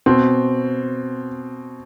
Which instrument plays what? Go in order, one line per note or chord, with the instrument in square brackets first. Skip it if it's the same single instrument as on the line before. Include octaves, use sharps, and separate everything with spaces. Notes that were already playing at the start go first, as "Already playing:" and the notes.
[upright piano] B2 C4